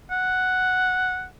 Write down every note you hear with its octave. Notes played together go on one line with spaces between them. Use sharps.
F#5